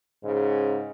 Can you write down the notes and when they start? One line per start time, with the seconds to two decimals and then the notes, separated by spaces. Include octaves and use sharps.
0.24 G#2 C#3